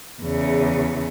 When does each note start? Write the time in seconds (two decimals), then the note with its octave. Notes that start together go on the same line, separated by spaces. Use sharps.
0.21 E2 C#3